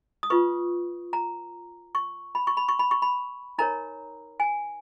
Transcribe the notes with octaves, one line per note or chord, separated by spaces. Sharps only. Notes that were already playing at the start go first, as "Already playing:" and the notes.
D#6
F4 B4 C#6
A#5
C#6
B5
C#6
B5
C#6
B5
C#6
B5
D#4 A#4 C#5 A#5
G#5